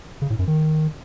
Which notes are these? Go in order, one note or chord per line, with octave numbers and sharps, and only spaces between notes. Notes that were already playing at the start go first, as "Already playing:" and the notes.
C#3
A2
F#2
D#3